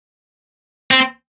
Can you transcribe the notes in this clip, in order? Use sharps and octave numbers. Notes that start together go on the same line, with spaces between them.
C4